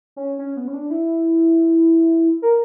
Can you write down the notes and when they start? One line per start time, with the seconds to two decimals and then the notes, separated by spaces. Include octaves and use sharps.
0.16 C#4
0.39 C#4
0.56 B3
0.68 C#4
0.73 D4
0.90 E4
2.42 A#4